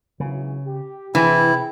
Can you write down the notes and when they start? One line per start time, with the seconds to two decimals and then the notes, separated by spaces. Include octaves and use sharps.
0.20 G#1 C#3 E3 F#3
0.65 G4
1.15 C3 E3 E4 G#4 G5